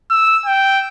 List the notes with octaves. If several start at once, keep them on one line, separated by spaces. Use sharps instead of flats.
E6
G5